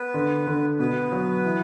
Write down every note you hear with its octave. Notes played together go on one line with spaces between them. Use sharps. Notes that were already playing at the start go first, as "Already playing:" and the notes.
Already playing: B3 B4
D3
D3
B2 B3 B4
F#3
E3